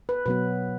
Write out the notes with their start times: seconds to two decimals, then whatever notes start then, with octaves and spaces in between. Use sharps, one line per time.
0.09 B4
0.26 B2 F#3 B3 B4